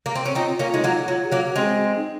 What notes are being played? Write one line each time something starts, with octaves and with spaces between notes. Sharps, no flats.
A#3
C4
C#4
C4 D#4 F4
A#3 C#4 F4
G#3 D#4
F#3 A#3 F4
F#3 F4
G#4
F#3 A#3 F#4
F#4
G#3 C4 G#4
D#4